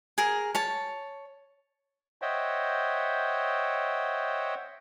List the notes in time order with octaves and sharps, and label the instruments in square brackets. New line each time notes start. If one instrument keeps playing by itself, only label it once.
[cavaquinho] G#4 A#4
C#5 A5
[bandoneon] C5 C#5 D#5 E5 F#5 G5